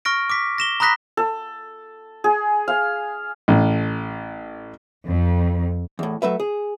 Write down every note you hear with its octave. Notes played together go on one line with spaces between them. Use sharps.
C#6 F6 A#6 D7
D6 B6
A#6 E7 G7
A#5 B5 D#6 F#6 A#6 B6
A4
G#4
F5
A1
F2
E2 A2
F#3 A3 B4 E5
G#4